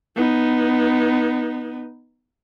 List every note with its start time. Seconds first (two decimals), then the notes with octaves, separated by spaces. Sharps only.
0.16 B3 D#4